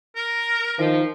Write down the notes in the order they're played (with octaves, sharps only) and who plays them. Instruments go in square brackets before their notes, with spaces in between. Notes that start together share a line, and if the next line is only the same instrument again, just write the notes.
[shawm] A#4
[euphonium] D#3 [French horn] F3